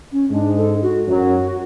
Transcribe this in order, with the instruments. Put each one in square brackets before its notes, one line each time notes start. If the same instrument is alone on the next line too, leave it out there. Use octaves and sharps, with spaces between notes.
[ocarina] C#4
[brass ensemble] G#2 G#3 [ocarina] D4
[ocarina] A4
F#4
[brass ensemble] F#2 F#3 [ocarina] F#4